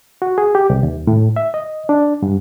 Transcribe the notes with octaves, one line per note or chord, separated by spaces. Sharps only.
F#4
G#4
G4
C2
D#2
A2
E5
D#5
D4
G2